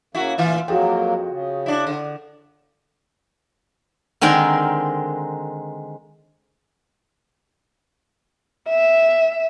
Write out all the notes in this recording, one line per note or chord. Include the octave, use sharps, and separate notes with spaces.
C#3 A#3 E4 F#4
D2 A#2 E3 F4 E5
F2 F#3 A#3 F#4 G#4 G5
C#3
D4 E4
D3
D3 D#3 G#3 C4 A#4
E5